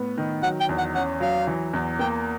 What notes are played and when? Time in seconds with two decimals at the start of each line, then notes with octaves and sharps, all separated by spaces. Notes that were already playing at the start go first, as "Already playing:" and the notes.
Already playing: A2 B3
0.17 D#3
0.42 F#3 F#5
0.60 G5
0.69 E2
0.78 F#5
0.94 C#4 F#5
1.20 F#3 F5
1.47 E3
1.73 E2
1.99 A#3 G5